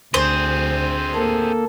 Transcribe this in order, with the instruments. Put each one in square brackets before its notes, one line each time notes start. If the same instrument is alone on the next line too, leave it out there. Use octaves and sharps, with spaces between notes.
[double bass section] D2 [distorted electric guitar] C4 G#4 [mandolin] C5
[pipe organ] A#3 A4